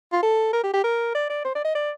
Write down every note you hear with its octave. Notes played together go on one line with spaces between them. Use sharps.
F4
A4
A#4
G4
G4
A#4
D5
D5
C5
D5
D#5
D5